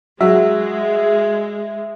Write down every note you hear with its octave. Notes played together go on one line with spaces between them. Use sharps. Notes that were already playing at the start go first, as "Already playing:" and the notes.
F#3 G#3 E5